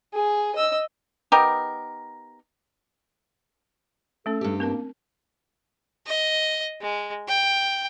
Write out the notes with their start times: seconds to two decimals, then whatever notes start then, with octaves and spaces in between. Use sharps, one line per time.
0.13 G#4
0.55 D#5 E6
1.32 B3 D#4 G4 A#4
4.26 A3 C#4 A4
4.41 G2 G4
4.60 A#3 C4 A#4 A5
6.06 D#5
6.81 G#3
7.28 G5